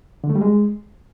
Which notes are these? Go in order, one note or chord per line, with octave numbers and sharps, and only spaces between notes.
D3
A3
G3
G#3